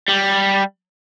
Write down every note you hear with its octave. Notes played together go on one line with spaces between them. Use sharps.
G3